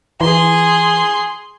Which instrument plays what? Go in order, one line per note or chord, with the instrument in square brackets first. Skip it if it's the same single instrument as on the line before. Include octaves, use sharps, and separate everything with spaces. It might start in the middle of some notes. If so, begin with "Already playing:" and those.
[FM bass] E3 [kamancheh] G#4 C6